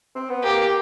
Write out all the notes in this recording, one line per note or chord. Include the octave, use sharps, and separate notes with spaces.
C4
B3
A#3 G4